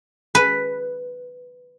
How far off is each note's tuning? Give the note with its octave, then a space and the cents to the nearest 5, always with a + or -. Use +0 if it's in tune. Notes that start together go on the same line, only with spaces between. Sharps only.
B4 +5